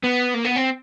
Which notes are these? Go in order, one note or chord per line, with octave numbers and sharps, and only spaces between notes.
B3
A#3
B3
C4